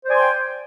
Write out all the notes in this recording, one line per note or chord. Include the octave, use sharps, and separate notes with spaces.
C5 D5 G5 G#5 C6